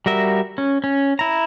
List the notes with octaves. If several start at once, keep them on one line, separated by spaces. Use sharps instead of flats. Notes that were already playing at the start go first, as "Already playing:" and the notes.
G3 F#4 A#4 E5
C#4
C#4
E4 A#5